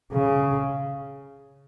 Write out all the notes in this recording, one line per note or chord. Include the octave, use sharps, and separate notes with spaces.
C#3